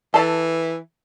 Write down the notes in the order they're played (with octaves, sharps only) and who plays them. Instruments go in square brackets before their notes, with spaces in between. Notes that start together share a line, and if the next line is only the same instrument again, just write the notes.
[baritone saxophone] E3 [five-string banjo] A4 A5